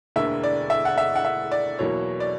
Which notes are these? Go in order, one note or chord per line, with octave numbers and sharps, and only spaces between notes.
E1 D2 D3 A#3 E5
D5
E5
F#5
E5
F#5
E5
D5
E2 B2 F#3 A#3 C#5
D5